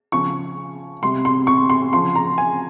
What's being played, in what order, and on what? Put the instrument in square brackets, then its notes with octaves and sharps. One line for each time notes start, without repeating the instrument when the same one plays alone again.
[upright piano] C#3 F3 C#6
C3 G3 C6
C6
C#6
C6
C#3 F3 C6
A#5
G#5